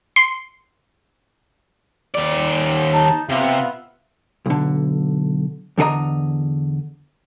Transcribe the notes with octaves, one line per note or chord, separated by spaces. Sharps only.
C6 C7
D#2 D5
D#4 A5
C3 B3 F4 E5
B1 D3
E2 D3 A4 D#5 A#5